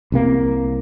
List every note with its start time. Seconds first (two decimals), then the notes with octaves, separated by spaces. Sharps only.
0.12 C2 C3 A#3